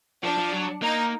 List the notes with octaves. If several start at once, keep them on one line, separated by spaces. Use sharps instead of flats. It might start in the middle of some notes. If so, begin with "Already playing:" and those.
F3 D4
F3
F#3
A#3 D#4